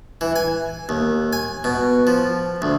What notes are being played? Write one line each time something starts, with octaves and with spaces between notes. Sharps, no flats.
E3
G#5
D#2
G#5
B2
F3
D2